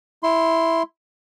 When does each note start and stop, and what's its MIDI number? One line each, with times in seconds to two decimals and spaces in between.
0.23 0.83 64
0.23 0.83 84